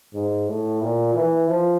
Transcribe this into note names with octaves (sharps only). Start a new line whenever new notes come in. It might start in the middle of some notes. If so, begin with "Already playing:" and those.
G#2
A2
A#2
E3
F3